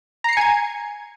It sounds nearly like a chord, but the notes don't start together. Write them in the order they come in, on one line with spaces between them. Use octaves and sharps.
A#5 C7 C#7 G#5 G#6